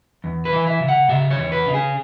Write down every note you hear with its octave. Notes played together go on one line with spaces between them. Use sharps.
E2
B4
E3
E5
C#3
F#5
C#3 E5
C#5
E2
B4
C#3
G#4